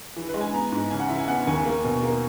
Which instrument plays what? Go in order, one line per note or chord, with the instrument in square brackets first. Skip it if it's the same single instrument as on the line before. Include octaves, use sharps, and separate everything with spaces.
[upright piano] E3
B4
G#3
G#5
B3 A#5
G#2
C#3 G#5
F#5
E3 E5
G#5
B3 F#5
D#2 G#5
A#3
B2
A#3